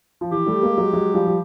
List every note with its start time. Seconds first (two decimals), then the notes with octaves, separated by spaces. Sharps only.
0.21 F3
0.31 E3 G4
0.46 G3 A3
0.63 G#3 A#3
0.77 F#3 G#3
0.93 F#3 G#3
1.14 F3 G3
1.27 G3